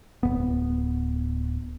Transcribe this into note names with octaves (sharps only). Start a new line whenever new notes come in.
D1 E2 B3